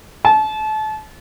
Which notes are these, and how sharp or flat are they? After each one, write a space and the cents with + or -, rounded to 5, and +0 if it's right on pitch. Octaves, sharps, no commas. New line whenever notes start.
A5 -30